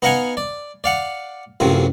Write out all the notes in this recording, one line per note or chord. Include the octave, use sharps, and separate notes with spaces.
B3 D#4 D#5 F5 F#5 G#5
D5
D5 F5 F#5
A1 F#2 A2 C3 F3